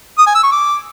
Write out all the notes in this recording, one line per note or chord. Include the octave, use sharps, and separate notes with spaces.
D#6
G#5
E6
C#6
D6